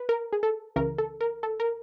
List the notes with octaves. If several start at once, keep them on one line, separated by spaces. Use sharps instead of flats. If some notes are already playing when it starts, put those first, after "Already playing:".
Already playing: B4
A#4
G#4
A4
C#2 C#3 E3 A#4
A4
A#4
A4
A#4